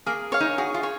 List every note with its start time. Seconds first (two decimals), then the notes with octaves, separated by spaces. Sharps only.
0.06 A#3 G#4
0.32 C#5 F5
0.40 D#4
0.58 F#4 G#4
0.74 F4
0.83 C#5